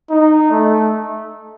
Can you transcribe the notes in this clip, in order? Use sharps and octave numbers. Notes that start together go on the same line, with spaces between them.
D#4
A3